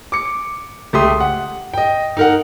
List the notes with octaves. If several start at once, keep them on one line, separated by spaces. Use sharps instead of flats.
D6 C#7
C#2 A3 G4 C6 D#6
F#5
D#5 G5
D#4 A#4 F#5